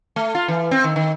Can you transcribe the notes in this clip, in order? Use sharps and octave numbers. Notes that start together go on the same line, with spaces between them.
A3
F4
E3
C4
D#3
D#3